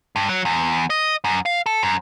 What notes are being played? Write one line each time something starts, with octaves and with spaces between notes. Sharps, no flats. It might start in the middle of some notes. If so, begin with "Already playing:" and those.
G2
F#3
E2
D#5
F#2
F5
A4
F#2